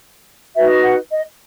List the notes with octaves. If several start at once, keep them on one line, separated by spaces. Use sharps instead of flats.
D#4 F#4 B4 E5
F#5
D#5